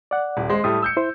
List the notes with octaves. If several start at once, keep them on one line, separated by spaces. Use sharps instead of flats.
D5 F#5
D#1
G#3 C5
A2 G3 A3 D#6
E6 G6 C#7
E4 C5